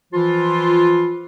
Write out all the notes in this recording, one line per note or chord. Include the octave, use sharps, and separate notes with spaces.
E3 F3 F4